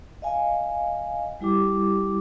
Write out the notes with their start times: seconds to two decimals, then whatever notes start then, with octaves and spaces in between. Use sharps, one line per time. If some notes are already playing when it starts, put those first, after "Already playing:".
0.22 D#5 F5 G#5
1.41 G3 E4 G4 D6